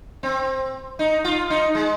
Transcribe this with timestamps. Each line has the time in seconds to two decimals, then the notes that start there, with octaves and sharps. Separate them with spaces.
0.23 C4
0.99 D#4
1.24 F4
1.50 D#4
1.75 G#3